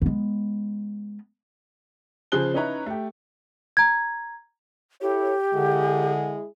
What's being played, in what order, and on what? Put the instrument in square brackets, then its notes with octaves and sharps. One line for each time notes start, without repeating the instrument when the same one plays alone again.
[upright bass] G#3 B3
[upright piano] C#3 F3 G#4 C5 F#6 G7
C#4 D#4 E4 B4 C#5 A#5
A3 G4
[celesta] A#5 G#6
[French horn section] E4 A4 C#5 [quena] G4
[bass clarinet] D3 [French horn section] G#3 E4 G#4